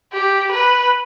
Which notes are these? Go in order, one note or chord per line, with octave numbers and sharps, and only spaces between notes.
G4
B4